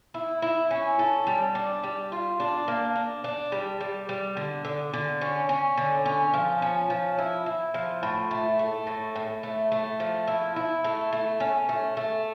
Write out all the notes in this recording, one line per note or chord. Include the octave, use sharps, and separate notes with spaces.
E4
E4
C#4
A4
G3
D4
G3
F4
D4
A#3
D4
D4
G3
G3
G3
D3
D3
D3
C#4
C#4
D3
C#4
F3
C#4
F3
E4
E4
F3
A2
A3
A3
A2
A2
A3
A3
F3
E4
E4
A3
A3
C#4
A3
A3